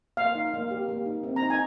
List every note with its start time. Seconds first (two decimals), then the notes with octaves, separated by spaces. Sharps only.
0.17 A#3 F5
0.35 D#4
0.54 A#3
0.71 G4
0.89 A#3
1.06 D#4
1.23 C4
1.36 A#5
1.42 D#4
1.50 G#5